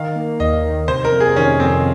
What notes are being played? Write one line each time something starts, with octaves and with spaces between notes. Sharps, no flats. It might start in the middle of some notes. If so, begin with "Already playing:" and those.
Already playing: D#3 F5
A#3
D#2 D#5
D#3
C3 C5
A#4
F2
G#4
D#3 C#4
F2 C4